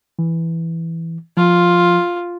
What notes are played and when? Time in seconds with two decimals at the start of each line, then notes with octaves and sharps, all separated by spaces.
0.19 E3
1.37 F3 F4